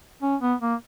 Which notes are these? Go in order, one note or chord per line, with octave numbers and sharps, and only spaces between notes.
C#4
B3
A#3